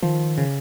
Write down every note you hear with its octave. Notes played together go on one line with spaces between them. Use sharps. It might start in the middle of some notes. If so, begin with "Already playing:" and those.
D#3 F3
C#3